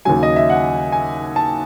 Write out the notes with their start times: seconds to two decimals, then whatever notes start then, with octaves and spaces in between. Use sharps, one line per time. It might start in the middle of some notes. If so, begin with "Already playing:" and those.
0.05 D#2 C#3 F#3 G#5
0.23 D#5
0.36 E5
0.50 F#5
0.92 G#5
1.36 A5